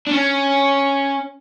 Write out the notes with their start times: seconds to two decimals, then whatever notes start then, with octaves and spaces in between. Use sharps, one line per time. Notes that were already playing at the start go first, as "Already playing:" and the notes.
0.07 D4
0.11 C#4